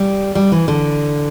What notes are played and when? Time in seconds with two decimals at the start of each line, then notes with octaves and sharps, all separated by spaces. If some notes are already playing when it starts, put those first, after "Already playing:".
Already playing: G3
0.35 G3
0.52 E3
0.68 D3